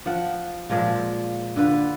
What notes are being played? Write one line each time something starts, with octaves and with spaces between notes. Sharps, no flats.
F3 F#5
A#2 F3 G#3 F4
D3 F4 B4